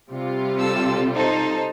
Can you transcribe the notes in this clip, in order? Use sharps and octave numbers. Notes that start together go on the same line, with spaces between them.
C3 G3 F4
A4 E6
D#4 A4 C5